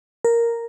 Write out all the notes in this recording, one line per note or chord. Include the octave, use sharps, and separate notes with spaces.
A#4